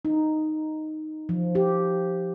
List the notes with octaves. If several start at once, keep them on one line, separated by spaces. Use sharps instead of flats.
D#4
F3
G4